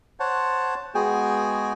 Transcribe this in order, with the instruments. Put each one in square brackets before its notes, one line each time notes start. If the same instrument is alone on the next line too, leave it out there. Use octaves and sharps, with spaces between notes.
[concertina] C5 C#5 F#5 A5
G#3 B3 F#4 G#4 G5 G#5